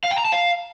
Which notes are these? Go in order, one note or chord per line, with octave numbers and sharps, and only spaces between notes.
F5
G5
A#5
A5
F5